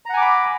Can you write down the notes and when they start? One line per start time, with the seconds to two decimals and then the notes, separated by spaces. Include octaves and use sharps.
0.06 A#5
0.09 F#5
0.13 G#5
0.17 D6
0.21 B5